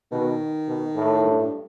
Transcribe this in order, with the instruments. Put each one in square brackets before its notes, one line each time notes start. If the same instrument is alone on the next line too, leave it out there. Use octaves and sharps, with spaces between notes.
[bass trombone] B2 [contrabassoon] D#3
[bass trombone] B2
A2
[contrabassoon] G2
G2